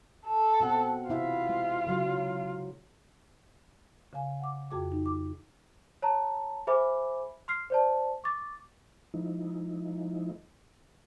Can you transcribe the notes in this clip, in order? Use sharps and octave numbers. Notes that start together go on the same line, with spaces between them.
A4
B2 C4 F#5
C3 E4 F4 E5
G#3
C#3 F#3
C#3 F5 G#5
F#5 D6
F2 F#4 G#4 G5 D6
D#4
D6
C#5 A5 A#5
G#4 C5 E5 G#5 B5 D6
C6 F6 C7
C5 D5 A5
C#6 D6 A6
F3 G#3 D#4 E4